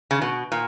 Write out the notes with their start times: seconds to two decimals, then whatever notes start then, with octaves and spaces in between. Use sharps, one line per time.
0.11 C#3
0.22 B2
0.52 A#2